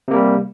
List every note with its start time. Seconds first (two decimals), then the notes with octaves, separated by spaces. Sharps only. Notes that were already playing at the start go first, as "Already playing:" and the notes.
0.08 C3
0.11 A#3
0.14 G3